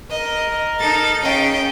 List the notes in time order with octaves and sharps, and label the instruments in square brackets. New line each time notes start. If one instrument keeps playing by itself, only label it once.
[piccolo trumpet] A#4 [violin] D#5
[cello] D#4 A4 [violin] A5 A6
[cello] C#3 [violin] D#5 G5